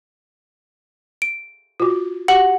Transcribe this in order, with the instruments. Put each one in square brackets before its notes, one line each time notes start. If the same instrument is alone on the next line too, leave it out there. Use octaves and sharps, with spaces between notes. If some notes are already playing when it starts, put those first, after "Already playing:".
[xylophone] D7
[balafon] F4 F#4
[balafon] F#4 G4 [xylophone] F#5 F#7